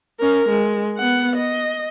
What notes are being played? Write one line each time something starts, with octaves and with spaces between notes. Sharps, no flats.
C#4 A#4
G#3
B3 F#5
D#5